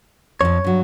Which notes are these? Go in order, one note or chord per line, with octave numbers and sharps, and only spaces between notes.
F2 F3 C#5
G2 F#3